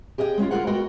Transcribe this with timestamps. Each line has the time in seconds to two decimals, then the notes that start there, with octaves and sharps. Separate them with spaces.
0.18 G4 G#4 D#5 F5 G5
0.37 G#3 C#4 D4 F4
0.51 A#3 F4 G#4 A#4 C5 F#5
0.67 G#3 B3 F#4 A#4 D#5 G5